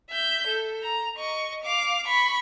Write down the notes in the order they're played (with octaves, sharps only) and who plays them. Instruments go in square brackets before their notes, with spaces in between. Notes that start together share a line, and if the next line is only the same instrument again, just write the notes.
[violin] E5 G6
A4
A#5
D#5 C#6
F5 D6
B5 C#6